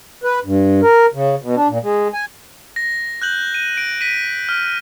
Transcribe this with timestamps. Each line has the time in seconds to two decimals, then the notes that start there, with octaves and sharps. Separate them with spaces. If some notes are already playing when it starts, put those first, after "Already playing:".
0.24 B4
0.45 G2
0.82 A#4
1.14 C#3
1.42 B2
1.56 D4
1.68 A#2
1.83 G#3
2.14 G#5
2.76 A#6
3.22 F#6 G6 F#7
3.54 D#7
3.77 D7
4.01 B6 D#7
4.49 F6